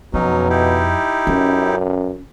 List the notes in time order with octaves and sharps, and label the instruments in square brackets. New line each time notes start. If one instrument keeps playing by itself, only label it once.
[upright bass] F2 [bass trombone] B2 [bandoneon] F#3 C#4 D#4
[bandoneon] D#4 E4 G4
[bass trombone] F#2 [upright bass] C#4